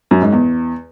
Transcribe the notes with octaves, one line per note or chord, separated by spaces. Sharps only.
F#2
G#2
E2